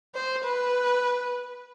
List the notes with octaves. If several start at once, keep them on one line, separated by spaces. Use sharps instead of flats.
C5
B4